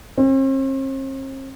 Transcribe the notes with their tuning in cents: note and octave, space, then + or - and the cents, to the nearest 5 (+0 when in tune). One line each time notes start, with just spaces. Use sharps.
C4 +45